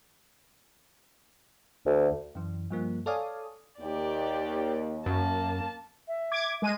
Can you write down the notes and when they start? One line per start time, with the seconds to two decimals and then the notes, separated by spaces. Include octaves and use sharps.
1.86 D2
2.35 F#2 E3
2.70 G2 F3 A#3
3.06 A4 C#5 D5 F5 G#5 D#6
3.80 D#2 G4 D5
5.06 F#2 A#3 A5
6.08 E5
6.32 D6 G#6
6.62 G#3 D#7